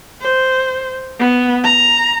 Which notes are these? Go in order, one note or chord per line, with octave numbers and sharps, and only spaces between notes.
C5
B3
A#5